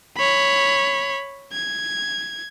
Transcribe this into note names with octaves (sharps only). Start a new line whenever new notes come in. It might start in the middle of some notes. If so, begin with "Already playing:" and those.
C#5 B5
G#6